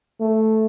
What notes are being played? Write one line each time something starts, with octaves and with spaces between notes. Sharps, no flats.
A3